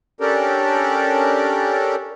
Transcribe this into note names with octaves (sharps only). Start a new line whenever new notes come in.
C#4 D4 G4 A4 A#4 D5